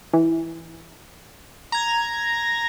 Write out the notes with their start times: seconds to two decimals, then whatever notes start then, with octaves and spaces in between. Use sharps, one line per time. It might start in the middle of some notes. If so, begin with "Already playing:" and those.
0.13 E3
1.72 A#5 G#6